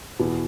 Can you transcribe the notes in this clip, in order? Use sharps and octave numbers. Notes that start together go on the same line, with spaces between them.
E2 B2